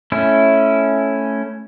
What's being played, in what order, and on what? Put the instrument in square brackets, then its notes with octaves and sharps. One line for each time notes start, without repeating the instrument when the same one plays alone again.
[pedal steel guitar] A3 C#4 E4